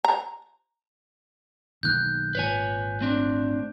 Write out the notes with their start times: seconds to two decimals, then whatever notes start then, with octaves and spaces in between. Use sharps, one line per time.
0.05 A#5
1.83 B1 D#3 A#3 F#6 G6
2.35 G#1 A#2 B4 C#5 G#5
3.01 A3 C4 D4